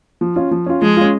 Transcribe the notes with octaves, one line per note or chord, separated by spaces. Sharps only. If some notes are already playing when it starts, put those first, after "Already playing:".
F3
C#4 F4
F3
C#4 F4
F3 G#3
C#4 F4